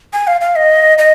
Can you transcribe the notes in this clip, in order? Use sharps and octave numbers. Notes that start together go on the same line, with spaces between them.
G#5
F5
F5
D#5
D#5